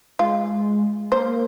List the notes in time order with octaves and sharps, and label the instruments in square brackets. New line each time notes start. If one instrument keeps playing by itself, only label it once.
[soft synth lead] G#3 [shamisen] F4
[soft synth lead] A#3 [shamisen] C5